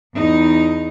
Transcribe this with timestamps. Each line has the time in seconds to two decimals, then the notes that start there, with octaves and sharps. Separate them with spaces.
0.14 E2 D#4